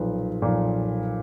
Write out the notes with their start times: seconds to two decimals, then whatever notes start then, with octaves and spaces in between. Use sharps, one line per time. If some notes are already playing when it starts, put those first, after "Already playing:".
Already playing: B1 A#2 F3 B4
0.42 B1 A#2 F3